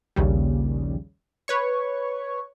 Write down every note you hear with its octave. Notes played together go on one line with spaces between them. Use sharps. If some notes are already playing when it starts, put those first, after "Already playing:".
A#1 D#2 C#3 G3
B4 C#5 C#6